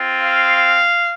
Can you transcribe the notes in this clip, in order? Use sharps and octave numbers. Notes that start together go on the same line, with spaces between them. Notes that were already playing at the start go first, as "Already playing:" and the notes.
Already playing: C4 F4
F5